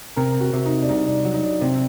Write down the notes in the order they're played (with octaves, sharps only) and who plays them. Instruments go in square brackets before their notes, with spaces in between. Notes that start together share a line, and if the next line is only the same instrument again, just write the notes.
[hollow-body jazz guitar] C3 [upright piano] A#4
[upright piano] F#4
[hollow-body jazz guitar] C3
[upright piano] D#4
D4
[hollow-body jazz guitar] C2 [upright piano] D#4
[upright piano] D4
[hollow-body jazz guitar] F#3
[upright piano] D#4
D4
[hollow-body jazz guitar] C3 [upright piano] C4